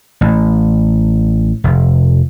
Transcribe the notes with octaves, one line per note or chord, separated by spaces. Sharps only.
A1
F1